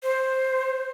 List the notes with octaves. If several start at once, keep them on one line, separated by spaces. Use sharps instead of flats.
C5